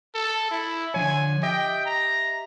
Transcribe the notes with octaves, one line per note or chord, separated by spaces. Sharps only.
A4
E4
D3 F3 C#5 G#5
G4 D#5 E5 G5
A#5